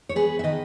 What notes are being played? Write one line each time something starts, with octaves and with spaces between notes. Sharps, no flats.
C#5
B3 G#4 B4
E5
D#3 B4 D#5